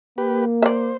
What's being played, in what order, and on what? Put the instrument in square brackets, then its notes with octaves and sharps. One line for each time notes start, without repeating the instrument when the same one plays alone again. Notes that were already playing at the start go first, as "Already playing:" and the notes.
[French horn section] A#3 [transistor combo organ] G4 B4
[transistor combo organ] C5 [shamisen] D5 E5